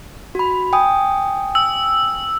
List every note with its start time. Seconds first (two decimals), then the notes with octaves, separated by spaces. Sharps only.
0.35 F#4 B5
0.73 G5 G#5 D#6
1.55 E6